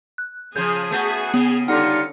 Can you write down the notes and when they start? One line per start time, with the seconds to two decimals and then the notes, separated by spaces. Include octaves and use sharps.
0.18 F#6
0.56 C#3 F3 G#4 G6 G#6
0.91 A3 B3 F#4
1.34 C#3 B3
1.68 D3 G3 D#4 F4 F#5 C#7